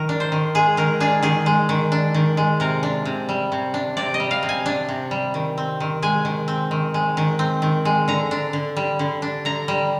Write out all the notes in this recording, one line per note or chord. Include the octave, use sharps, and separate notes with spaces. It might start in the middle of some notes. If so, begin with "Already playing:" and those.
Already playing: D#3 A#4
D4
C5
D#3
G#3 G#4
D#3 A#4
D4 G#4
D#3 G#4
G#3
D#3
D4
D#3
G#3
C3 A#4
D4
C3
G3
C3
D4
C3 D5
D#5
G3
F5
C3
G#5
D4
C3
G3
D#3
C4
D#3
G#3 G#5
D#3
C4
D#3
G#3
D#3
C4
D#3
G#3
D3 A#5
D4
D3
G3
D3
D4
D3 A#5
G3